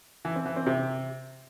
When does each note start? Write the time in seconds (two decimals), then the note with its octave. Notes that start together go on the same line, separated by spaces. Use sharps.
0.25 E3
0.35 C4
0.46 E3
0.56 C4
0.66 C3